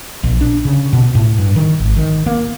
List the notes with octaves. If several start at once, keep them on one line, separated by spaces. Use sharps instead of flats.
A#1
D4
C#3
B2
A2
G2
D#3
G#1
D#3
A#3